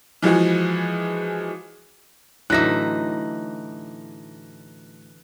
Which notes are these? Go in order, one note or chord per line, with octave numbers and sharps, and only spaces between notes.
E3 F3 G#3 F#4 G#4
A2 D3 E3 F#3 D#4 E5 F#6 A#6